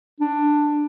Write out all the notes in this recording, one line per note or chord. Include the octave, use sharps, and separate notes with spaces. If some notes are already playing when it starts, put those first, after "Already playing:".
D4